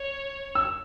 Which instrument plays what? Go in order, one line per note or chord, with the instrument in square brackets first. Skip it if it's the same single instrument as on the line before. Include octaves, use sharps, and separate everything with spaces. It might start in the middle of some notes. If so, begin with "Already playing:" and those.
Already playing: [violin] C#5
[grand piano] E6